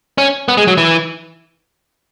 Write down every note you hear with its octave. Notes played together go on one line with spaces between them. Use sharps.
C#4
B3
G#3
F#3
E3